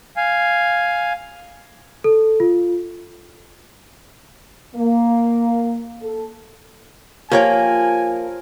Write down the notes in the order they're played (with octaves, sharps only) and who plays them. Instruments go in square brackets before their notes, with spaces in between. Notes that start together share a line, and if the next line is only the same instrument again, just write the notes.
[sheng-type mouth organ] F5 G#5
[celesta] A4
F4
[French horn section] A#3
A4
[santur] F3 A#4 [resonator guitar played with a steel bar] A#3 [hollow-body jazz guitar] G4 C#5 G5 [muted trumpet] G#5